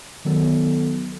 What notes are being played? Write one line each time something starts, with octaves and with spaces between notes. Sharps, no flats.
D#3 F#3 B3 A4